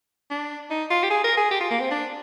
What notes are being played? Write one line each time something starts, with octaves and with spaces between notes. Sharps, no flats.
D4
D#4
F4
G4
G#4
A#4
G#4
G4
F4
A#3
C4
D4